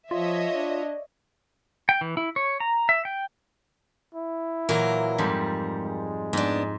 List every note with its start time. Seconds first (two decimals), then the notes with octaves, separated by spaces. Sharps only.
0.11 F3 F4 C#5 D#5 E5
0.54 D4 D5
1.89 G5
2.01 E3
2.17 E4
2.36 C#5
2.60 A#5
2.89 E5
3.05 G5
4.15 E4
4.69 A#2 E3 F#3 A#4
5.18 F2 G#2 G3
5.83 G#3
6.33 G#2 B3 D4